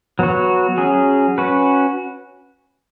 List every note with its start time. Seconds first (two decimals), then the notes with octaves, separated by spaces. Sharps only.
0.19 F#3 B3 F#4
0.78 F#3 C#4 G#4
1.38 C#4 F#4 B4